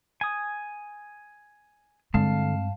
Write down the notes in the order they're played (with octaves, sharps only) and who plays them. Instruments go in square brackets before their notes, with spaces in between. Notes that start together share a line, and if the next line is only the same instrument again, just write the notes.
[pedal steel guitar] G#5 D#6
[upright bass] G2 [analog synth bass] D3 [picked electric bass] G#3 C4 [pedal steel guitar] F5 A5